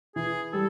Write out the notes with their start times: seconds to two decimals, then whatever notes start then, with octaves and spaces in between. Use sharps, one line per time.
0.15 E3 G#4
0.53 G3 A4